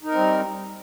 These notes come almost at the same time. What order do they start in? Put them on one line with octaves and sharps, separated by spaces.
D#4 A#4 C4 G3